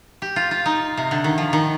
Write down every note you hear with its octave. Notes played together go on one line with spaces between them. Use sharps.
G4
F4
F4
D#4
C3
D3
D#3
F3
D#3